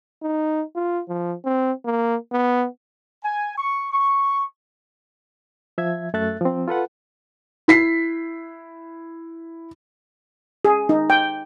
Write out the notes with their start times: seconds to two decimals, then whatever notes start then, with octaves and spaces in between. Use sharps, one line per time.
0.23 D#4
0.76 F4
1.09 F3
1.45 C4
1.85 A#3
2.32 B3
3.23 G#5
3.58 C#6
3.91 C#6
5.78 F3 E5 G#6
6.14 F#2 A3 A4 E5 F#6 A6
6.41 F3 C4
6.68 F4 A4 B4 F#5
7.68 E4 B6 C7
10.65 G#4
10.89 D#4
11.10 G5